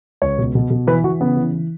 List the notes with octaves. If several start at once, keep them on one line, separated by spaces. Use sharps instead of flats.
C#2 C#5
B2
B2
B2
E3 B4
E3 F#4
C#3 B3
E3
E3